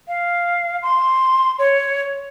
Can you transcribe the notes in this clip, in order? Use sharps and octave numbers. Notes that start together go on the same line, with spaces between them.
F5
C6
C#5